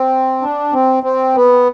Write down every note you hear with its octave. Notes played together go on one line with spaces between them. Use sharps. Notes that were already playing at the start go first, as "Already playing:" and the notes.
Already playing: C4
D4
C4
C4
B3